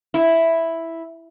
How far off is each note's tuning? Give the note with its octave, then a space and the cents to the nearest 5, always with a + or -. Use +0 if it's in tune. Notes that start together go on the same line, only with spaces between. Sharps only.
E4 +0